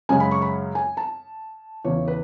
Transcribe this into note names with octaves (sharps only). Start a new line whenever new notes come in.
F#2 C#3 G#3 C#4 G#5
B5
C#6
B5
G#5
A5
E2 C#3 E3 C#5
B4